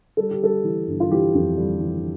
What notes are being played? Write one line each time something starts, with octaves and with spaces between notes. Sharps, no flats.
G3 A4
G4
G3 A4
E3
G1
F4
E3 G4
F2
G3
E3